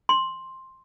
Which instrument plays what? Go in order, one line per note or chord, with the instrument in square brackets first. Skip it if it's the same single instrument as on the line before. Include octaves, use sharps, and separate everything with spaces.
[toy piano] C6